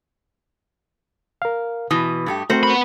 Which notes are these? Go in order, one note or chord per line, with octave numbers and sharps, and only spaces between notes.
A#4 F5
B2 E3 D#6
G2 A3 G4
A3 C4 F#4 A#4 C5
B3 B5